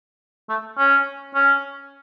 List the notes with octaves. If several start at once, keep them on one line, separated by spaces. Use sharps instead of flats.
A3
C#4
C#4